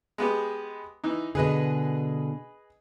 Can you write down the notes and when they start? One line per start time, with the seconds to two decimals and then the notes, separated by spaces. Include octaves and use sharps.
0.18 G#3 B3 G4
1.04 E3 D#4
1.35 B2 D3 G#4 B4 D#5